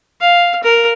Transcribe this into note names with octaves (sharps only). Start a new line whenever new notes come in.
F5
A#4